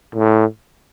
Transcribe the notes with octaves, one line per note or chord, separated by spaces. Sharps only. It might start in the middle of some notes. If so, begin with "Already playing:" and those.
A2